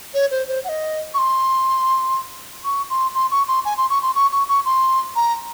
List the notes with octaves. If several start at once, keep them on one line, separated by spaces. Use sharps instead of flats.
C#5
C5
C5
F#5
D#5
C#6
C6
C#6
C6
C6
C#6
C6
G#5
C6
C#6
C6
C#6
C#6
C#6
C6
A#5